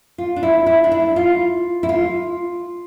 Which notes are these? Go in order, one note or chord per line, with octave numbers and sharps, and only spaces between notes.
F4
D4
E4
E4
D4
E4
F4
E4
F4